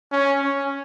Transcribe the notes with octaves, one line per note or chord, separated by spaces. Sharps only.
C#4
C#4